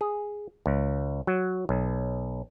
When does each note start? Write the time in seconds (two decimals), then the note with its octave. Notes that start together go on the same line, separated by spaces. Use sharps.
0.01 G#4
0.66 C#2
1.27 F#3
1.69 B1